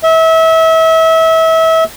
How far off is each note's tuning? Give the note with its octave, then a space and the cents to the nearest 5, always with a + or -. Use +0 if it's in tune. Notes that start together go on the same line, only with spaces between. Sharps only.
E5 -30